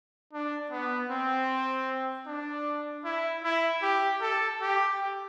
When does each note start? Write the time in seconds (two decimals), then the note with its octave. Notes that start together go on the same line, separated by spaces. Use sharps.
0.33 D4
0.71 B3
1.11 C4
2.27 D4
3.05 E4
3.44 E4
3.82 G4
4.21 A4
4.61 G4